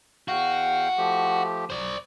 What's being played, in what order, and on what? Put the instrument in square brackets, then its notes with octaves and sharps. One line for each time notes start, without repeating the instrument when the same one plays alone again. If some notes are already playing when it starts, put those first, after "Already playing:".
[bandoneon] E2 F5 G5 [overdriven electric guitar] F#4
[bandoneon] F3 A3 G4
[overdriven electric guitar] C5 D5